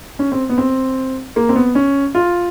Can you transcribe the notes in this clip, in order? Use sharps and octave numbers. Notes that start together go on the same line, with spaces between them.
C#4
C4
B3
C4
A#3
C4
B3
C#4
F4